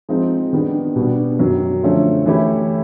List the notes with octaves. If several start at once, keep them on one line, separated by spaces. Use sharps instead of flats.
F3 G#3 C4 D#4
D#3 G3 B3 D4
B2 G3 B3 D4
F#2 D#3 F#3
D3 F3 A3 C#4
E3 A3 C#4 E4 G4